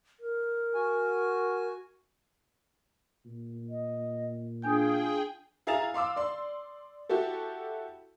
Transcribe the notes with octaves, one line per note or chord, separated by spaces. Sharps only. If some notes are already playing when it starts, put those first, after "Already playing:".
A#4
F#4 G#5
A#2
D#5
D4 F4 G#4 G5 G#5 G6
E4 G#4 F5 A#5 A6 F7
F5 C6 D6 E6
D5 C6
E4 F#4 G4 A4